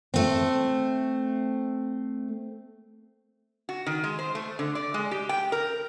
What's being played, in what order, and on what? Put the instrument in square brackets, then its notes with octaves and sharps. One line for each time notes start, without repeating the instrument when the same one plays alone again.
[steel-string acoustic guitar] A3 C4
[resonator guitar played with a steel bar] F#4
D#3
G#3
C5
A3
D3
D5
G#3
G4
G5
A#4